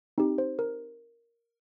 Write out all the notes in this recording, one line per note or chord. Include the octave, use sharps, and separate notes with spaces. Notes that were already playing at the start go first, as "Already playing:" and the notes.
C4 D#4 G4
C5
A#4